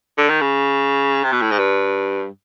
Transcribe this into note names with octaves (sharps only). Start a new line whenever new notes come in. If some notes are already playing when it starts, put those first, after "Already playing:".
D3
D#3
C#3
C3
B2
A2
G#2
G2